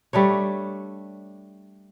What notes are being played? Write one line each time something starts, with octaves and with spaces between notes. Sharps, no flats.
G3 A3 D4 C#5